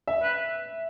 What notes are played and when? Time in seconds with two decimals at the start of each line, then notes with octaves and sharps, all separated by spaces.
0.07 E5
0.22 B4